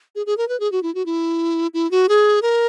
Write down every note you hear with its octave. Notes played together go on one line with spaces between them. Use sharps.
G#4
G#4
A#4
B4
G#4
F#4
E4
F#4
E4
E4
F#4
G#4
A#4